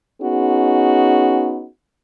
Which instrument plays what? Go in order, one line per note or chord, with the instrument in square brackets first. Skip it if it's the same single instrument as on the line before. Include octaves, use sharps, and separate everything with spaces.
[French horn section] B3 C#4 D#4 F#4 G#4